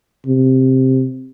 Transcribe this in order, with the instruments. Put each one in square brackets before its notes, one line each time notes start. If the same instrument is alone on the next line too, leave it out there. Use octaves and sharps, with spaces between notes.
[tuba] C3